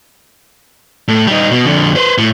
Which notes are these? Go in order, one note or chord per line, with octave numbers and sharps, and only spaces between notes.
A2
G3 D#4
B2
F2 D3
B4 C5
A2